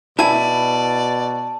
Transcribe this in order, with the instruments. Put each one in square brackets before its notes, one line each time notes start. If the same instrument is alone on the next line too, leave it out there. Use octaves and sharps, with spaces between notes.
[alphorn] B2 [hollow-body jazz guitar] E4 G#5 [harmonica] D5 [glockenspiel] A5